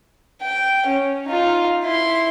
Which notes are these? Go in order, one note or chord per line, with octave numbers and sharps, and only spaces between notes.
G5
C#4
D#4 F4
E4 C6